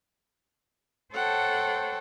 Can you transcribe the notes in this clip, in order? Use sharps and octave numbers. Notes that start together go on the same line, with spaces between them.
A4 C5 C#5 F#5 G5 A5